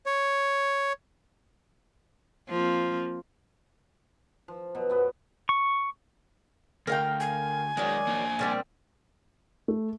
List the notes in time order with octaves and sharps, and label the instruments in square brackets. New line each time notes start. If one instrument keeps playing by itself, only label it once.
[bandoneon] C#5
[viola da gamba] F3 A#3 C4
[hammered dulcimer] F3
B2 F#3
F#2 B3 C#4
[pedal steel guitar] C#6
[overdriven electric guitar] D2 [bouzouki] A#4 F5 G5
[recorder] G#5
[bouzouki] D#3 F#3 D5 [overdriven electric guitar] G#3 D4
[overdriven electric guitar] A#3 D4
[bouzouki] A#2 G3 C4
[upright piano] A3